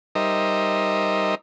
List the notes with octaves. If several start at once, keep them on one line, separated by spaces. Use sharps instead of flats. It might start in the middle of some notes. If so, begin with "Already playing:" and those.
G3 D#4 A#4 C5 D#5 E5